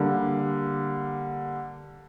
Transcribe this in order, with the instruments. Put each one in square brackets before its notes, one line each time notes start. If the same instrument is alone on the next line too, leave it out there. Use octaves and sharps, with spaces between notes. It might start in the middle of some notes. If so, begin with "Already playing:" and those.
Already playing: [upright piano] D3 G3 A#3